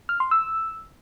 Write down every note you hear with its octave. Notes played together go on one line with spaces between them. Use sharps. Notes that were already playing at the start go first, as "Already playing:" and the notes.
F6
C6
E6